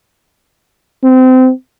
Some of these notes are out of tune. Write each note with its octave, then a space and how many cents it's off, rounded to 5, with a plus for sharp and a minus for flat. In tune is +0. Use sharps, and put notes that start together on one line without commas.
C4 -25